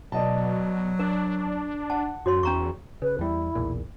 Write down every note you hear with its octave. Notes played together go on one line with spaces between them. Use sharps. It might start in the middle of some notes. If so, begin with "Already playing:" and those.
B2 F#3 D5 D#5 A5
D4 A#4
F#5 A5
F#2 F#4 C#5 C6
E2 C#4 A#5 C#6
C#3 B4
E2 G3 E4
B1 E2 A#2